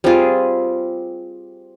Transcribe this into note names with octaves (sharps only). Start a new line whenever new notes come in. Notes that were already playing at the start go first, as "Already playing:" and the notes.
G3 C4 F4 G#4